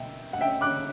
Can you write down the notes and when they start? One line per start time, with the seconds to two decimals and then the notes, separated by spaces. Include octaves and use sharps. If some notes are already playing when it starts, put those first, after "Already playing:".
Already playing: B2 E5 G5
0.33 F#5
0.41 E5 G5
0.61 D6 F#6